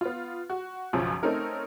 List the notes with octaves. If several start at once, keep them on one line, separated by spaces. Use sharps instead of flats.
B3 F4
F#4
B1 F#2 C#3 F3 F4
A3 C4 C#4 D#4 A#4